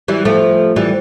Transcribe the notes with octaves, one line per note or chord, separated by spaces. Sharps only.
E3 G3
F3 A3
E3 G3